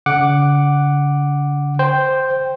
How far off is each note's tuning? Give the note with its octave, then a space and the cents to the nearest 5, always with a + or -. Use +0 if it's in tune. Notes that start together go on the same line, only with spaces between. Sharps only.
D3 -45 F#5 +0 D6 +0
C5 +0 G5 +0